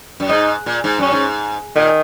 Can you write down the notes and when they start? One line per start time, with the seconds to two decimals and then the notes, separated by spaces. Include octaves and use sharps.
0.20 F#2
0.29 G#2 D#4
0.66 A#2
0.84 G#2
0.99 F#2 C#4
1.12 G#2
1.75 A#2 D#3